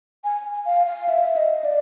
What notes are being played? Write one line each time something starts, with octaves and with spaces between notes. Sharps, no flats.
G#5
F5
F5
E5
D#5
D5